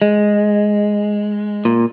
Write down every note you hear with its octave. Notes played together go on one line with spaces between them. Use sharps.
G#3
A#2